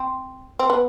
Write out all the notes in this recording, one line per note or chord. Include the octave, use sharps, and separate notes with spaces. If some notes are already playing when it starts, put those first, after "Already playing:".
Already playing: C4
C4
B3